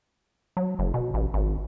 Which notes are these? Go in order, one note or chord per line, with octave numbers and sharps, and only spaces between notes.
F#3
F#1
B2
A1
G#1